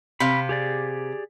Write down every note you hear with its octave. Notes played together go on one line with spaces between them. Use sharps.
C3 F5 B5
G4 G#4 D5